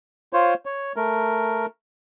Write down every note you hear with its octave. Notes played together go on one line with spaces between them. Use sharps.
F4 C5 C#5
C#5
A3 A#4